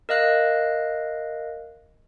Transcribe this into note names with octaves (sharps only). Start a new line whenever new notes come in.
A#4 D#5 F5 F#6